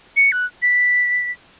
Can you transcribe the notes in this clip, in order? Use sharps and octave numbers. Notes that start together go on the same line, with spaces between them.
C#7
F#6
B6